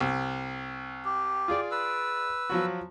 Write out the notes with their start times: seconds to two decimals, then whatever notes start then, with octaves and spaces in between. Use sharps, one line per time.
0.01 C2
1.05 G4
1.48 F4 G#4 D5
1.71 B4 E6
2.50 F3 F#3 F#4